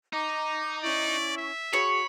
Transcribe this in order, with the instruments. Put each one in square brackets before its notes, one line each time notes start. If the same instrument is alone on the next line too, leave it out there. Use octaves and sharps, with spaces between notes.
[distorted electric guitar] D#4 [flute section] A#5 D6
[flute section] C#4 E4 C#6 [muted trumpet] D5
[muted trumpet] E5
[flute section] F#4 G#4 [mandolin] C#5 [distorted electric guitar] B5